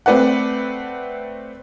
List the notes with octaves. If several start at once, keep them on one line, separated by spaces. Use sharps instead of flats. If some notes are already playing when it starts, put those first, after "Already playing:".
A3 C4 B4 D5 F#5